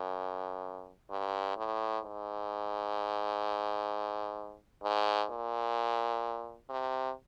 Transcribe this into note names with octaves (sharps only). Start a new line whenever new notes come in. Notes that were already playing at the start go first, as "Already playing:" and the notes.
Already playing: F#2
G2
A2
G#2
G#2
A#2
C3